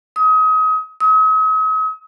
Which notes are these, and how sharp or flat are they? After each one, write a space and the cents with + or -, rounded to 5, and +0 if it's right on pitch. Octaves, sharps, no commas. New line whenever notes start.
D#6 +30
D#6 +45